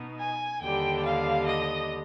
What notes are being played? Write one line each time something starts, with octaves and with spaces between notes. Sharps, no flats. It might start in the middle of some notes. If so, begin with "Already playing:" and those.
Already playing: B2 B3 D#4
G#5
D#2 D3 G3 G5
F5
D#5